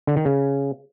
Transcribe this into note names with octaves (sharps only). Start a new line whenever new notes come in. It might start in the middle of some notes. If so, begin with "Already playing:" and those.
D3
D#3
C#3